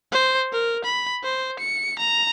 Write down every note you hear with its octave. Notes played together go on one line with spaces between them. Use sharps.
C5
A#4
B5
C5
C#7
A#5